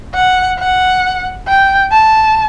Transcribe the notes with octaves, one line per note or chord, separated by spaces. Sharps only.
F#5
F#5
G5
A5